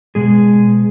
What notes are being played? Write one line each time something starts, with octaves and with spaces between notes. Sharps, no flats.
B2 G#3 G#4